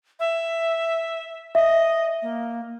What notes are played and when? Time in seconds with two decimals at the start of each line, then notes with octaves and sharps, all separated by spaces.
0.20 E5
1.55 D#5 E5
2.22 A#3